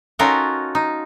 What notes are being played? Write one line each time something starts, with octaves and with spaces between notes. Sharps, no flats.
C#4 D#4 F4 F#4 A4 A#4
D#4